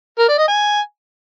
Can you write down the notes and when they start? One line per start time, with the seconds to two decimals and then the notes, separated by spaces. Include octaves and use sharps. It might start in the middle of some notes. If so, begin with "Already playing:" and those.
0.19 A#4
0.28 D5
0.38 D#5
0.48 G#5